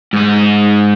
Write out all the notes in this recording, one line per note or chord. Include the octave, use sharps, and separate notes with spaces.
G#2 D#4